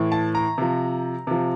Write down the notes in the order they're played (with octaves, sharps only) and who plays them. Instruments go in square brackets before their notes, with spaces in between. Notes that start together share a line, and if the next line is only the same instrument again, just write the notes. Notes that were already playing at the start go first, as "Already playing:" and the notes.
Already playing: [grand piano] A2 E3
A5
A#5
C3 F3
C3 F3